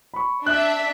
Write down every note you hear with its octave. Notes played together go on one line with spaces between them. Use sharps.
B5 C#6
D4 E5 F#6